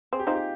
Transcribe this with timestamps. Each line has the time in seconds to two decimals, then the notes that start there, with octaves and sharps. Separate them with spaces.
0.13 C4 G#4
0.19 G4
0.27 C4 D#4 F4
0.35 G4